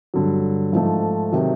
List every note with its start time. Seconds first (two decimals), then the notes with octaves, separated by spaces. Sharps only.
0.14 G2 D3 F#3
0.73 G#2 F3 A3
1.32 C3 D#3 F#3